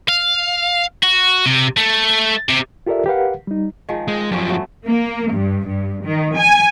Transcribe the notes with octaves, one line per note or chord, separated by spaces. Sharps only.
F5
F#4
C3
A3
C3
F4 G4 A4 A#4 D5 E5
G4 A#4 B4 F5 F#5
G3 D#4
D#3 F3 G#3
G#3 C4
F#2 F3 G3 C#4
F#3 A3 B3
A#3
G2
G2
D#3
G#5